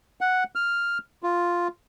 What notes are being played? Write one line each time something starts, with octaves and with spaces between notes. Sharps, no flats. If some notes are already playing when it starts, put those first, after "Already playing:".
F#5
F6
F4